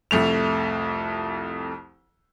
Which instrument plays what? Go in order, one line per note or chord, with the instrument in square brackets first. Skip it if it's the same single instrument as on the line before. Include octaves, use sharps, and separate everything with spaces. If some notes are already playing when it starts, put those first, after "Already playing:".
[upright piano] C2 F2 A3 F7